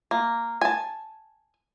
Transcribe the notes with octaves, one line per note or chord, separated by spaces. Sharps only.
A#3
G#5 A5